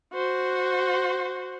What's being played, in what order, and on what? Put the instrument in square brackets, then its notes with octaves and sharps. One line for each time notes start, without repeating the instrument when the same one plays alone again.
[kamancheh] F#4 C5